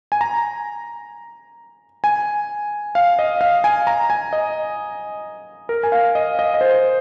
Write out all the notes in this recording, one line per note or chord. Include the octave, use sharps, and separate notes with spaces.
G#5
A#5
G#5
F5
D#5
F5
G#5
A#5
G#5
D#5
A#4
G#5
F5
D#5
D#5
D#5
C5